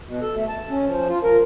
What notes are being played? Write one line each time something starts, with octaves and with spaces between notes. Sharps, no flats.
B2
A4
A3
A5
C#4
F3
F4
A#4